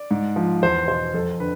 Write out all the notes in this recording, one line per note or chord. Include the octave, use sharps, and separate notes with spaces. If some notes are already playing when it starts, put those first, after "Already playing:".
Already playing: D5
G#2
F3
E2 C5
B2 C5
F2 A4
D3 B4